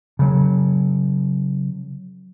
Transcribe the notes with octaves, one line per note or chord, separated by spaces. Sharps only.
C#3 F#3